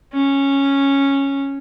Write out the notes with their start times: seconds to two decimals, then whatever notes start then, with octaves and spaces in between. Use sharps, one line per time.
0.13 C#4